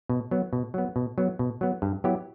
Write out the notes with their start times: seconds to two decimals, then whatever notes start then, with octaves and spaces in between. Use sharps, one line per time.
0.09 B2
0.31 F#3 B3
0.53 B2
0.74 F#3 B3
0.96 B2
1.18 F#3 B3
1.39 B2
1.61 F#3 B3
1.82 G2
2.04 F#3 B3 E4 G4